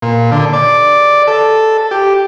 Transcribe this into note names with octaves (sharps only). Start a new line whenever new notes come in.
A#2
D3
D5
A4
G4